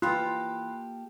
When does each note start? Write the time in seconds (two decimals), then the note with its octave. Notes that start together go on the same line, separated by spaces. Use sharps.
0.02 E3 A#3 F4 G4 A4 B5 C6 F#6